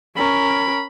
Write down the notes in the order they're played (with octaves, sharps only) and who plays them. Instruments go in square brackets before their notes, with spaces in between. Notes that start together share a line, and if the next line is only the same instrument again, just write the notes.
[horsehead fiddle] C#4 A#4 [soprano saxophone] B5